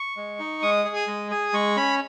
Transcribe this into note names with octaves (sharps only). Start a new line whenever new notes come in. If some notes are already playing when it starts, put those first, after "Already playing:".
Already playing: C#6
G#3
D#4
G#3 D#6
G#4
D#6
G#3
G#4 D#6
G#3 C#6
C#4 B5